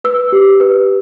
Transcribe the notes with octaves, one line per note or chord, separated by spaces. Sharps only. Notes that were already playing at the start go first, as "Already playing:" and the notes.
B4 E6
G4
B4